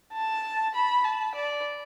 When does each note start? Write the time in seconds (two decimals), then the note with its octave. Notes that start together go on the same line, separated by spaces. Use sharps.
0.13 A5
0.74 B5
1.04 A5
1.35 D5